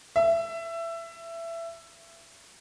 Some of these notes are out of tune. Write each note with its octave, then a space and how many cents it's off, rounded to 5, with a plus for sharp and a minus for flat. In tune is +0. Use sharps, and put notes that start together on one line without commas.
E5 +20